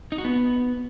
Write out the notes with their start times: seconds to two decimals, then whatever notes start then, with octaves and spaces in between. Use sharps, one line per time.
0.12 D#4
0.18 F#4
0.25 B3